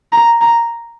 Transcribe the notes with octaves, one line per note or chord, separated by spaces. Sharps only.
A#5
A#5